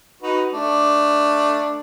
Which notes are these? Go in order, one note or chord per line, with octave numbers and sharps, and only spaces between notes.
D#4 F#4 B4
A3 D4